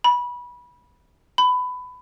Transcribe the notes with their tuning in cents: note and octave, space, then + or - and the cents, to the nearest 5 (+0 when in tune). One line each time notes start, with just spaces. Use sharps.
B5 -20
B5 +20